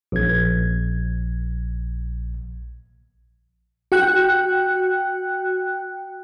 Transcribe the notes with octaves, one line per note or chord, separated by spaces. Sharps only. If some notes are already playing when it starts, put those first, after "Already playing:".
A#1 G#6
F#4 G5 F#6